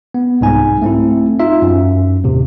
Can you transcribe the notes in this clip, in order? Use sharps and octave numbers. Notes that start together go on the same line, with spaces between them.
B3
C2 G#2 D#4 G#5
A3 C4 E4
D#4 F4 E5
F#2
D#2 A2 C3